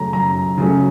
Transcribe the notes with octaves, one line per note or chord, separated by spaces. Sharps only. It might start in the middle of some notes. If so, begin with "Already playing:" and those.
Already playing: F#2 C#3 F#3 A3 C#4 A#5
F#2 A#5
C#3 F#3 A3 C#4